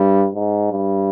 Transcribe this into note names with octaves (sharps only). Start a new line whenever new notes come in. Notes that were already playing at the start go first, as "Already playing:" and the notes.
Already playing: G2
G#2
G2